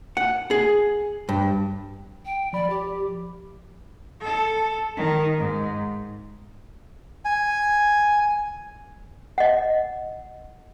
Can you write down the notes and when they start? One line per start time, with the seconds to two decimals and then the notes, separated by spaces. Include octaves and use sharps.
0.17 F#5
0.51 G#4
1.29 G2
2.25 G5
2.53 F3 D5 B5
2.70 G4
4.23 A4
4.97 D#3
5.38 G#2
7.25 G#5
9.38 D#5 F#5